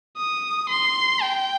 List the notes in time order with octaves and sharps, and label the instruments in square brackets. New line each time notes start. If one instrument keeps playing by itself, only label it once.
[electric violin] D#6
C6
G5